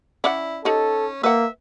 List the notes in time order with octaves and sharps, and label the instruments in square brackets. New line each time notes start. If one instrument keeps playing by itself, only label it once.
[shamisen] C#4 D5 F#5 [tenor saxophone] E4
[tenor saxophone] C#4 [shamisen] D#4 G4 [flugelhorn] A4
[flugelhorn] A#3 [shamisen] B4 F#5 [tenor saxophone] E5